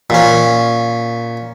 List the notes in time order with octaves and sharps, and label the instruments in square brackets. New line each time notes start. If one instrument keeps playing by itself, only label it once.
[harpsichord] A#2 C#4